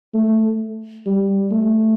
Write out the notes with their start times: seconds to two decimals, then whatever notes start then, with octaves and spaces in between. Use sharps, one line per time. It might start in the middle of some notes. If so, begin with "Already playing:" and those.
0.14 A3
1.06 G3
1.52 A3